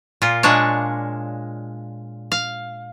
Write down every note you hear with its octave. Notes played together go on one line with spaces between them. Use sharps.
A#2 F4
A#2 G#3 D4 C#5
F5